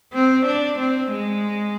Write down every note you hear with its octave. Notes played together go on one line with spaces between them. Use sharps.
C4
D4
C4
G#3